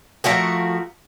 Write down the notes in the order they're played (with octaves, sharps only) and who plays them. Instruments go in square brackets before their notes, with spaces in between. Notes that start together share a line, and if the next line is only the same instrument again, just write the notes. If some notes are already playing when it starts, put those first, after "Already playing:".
[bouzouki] F3 A3 F#4 A#4